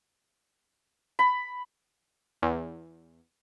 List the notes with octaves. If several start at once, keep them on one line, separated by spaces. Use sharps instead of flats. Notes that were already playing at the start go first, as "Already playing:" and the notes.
B5
E2